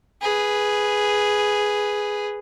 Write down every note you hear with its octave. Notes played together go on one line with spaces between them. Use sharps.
G#4 B4